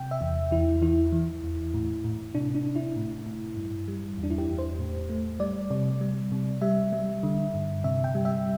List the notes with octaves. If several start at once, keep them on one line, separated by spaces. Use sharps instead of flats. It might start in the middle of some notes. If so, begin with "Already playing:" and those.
Already playing: C3 G5
E5
E2
E2 E4
E3 E4
E3
E2
A2
A2
C3 D4
D4
C3
E4
A2
A2
G2
G3
E2
D4
E4
G4
E2
C5
A2
A3
G3 D5
C3 D5
G3
C3
G3 E5
G3
D3
G2
C3 E5
G5
G3
E5